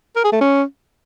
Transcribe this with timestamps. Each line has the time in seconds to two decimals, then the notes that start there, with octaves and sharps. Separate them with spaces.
0.16 A#4
0.24 G#4
0.33 A3
0.41 C#4